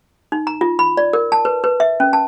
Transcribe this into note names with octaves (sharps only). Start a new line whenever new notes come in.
D#4
A#5
F4
B5
D5
A#4
A5
B4
B4
E5
C#4
A5